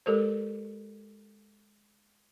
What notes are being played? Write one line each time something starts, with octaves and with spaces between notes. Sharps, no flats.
G#3 G4 A4 A#4 C5